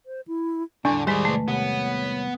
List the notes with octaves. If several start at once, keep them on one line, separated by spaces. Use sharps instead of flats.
C5
E4
E2 A2 D3 G3 D4
D#3 G3 G#3 G#4 C5 D5
C2 A3 B4
C2 B3 C#5